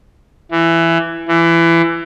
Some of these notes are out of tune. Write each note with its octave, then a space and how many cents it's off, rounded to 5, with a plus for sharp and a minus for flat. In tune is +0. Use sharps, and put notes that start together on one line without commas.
E3 +15
E3 +25